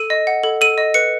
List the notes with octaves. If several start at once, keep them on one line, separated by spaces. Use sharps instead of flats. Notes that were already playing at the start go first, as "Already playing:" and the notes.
Already playing: A4 D#7
D#5
F#5
A4
A4 D#7
D#5
B4 C#7